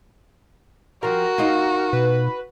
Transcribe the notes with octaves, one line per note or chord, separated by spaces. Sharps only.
F3 G3 F#4 A#4
D#4 F4
B2 B4